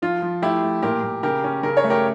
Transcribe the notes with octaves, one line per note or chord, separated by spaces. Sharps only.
F3 F4
F3
A3 E4 G4
A3
A#2 G4 A#4
A#2
C#3 G4 A#4
C#4
C#3 A#4
C#5
A3
G4 A#4